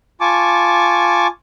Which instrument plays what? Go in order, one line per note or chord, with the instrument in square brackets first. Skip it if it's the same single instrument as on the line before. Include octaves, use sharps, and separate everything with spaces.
[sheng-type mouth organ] F4 G#5 A5 C#6 D6